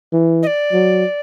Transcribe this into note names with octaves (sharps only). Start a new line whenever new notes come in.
E3
D#5
D5
F#3